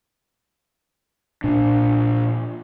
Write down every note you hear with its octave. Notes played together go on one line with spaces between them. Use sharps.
A#2 D4